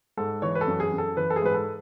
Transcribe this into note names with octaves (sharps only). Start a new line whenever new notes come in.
G#2 A4
E3 C#5
B4
A4
F#2
G#4
F#2
A4
E3 B4
A4
G#4
G#2 B4
A4